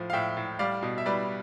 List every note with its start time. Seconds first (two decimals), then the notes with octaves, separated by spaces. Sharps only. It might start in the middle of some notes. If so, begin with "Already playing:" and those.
Already playing: A2 F3
0.10 F5
0.13 A2 E5 G5
0.37 A2
0.59 G3 D5 F5
0.83 B2
0.98 E5
1.06 G3 B4 D5